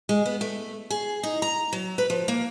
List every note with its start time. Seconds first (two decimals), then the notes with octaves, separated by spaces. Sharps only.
0.09 G#3
0.26 B3
0.41 A3
0.90 G#4
1.23 D#4
1.42 A#5
1.73 F#3
1.98 B4
2.10 F3
2.28 A#3